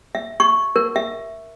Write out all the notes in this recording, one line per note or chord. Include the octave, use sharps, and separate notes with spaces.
E5
C#6
A#4
E5